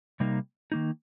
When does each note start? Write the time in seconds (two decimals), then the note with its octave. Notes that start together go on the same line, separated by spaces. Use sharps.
0.20 C3 G3 A#3 D#4
0.72 D#3 A#3 D#4